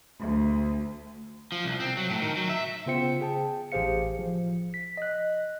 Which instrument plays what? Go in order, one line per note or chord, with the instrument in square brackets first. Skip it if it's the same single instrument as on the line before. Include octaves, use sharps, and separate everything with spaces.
[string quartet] D2
[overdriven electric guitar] F3
C2
C4
F#3
A2
D#3
F#3
E5
[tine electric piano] C#3 B3 F4 C5 G5 C#7
G#4 G5 A5
A1 G4 G#4 C5 F5 C#7
F3
B6
D#5 F#6